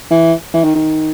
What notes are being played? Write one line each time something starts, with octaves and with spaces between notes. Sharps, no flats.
E3
E3
D#3
D#3